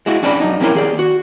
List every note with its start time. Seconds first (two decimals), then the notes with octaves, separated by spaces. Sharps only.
0.06 G#3 E4 F#4
0.22 F2 C#4 D4 D5 B5
0.40 F#2 D#4
0.60 F2 C3 C#4 E4 A#4 C6
0.74 D#2 G#4 D5
0.99 F#4